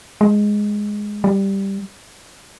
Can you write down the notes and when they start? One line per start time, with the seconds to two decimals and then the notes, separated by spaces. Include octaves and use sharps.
0.21 G#3
1.24 G3